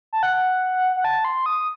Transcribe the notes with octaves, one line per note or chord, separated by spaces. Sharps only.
A5
F#5
F#5
A5
C6
D#6